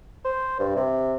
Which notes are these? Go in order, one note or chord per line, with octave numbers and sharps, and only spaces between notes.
C5
G2
C3